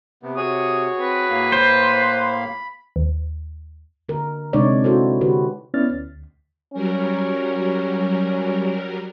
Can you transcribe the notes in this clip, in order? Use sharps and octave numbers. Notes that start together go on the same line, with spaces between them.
C3 B3
F#4 G#4 C#5 D#6
C4 B4
A2 A#3 F5
C5 B5
D#2
D3 A#4
C3 G#3 D4 D#4 C#5 D5
D4 E4 F#4 A4 C5
D3 F#4 G4 B4
B3 C#4 E4 D5 F6 A6
D2
F#3 G3 C#4 A#4